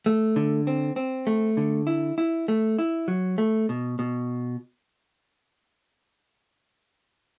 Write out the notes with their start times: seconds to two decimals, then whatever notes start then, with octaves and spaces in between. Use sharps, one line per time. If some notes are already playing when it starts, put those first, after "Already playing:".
0.06 A3
0.36 D3
0.67 C4
0.96 C4
1.27 A3
1.57 D3
1.87 E4
2.18 E4
2.48 A3
2.79 E4
3.08 F#3
3.38 A3
3.69 B2
3.99 B2